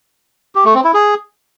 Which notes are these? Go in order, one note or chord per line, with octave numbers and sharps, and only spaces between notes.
G4
A3
C4
E4
G#4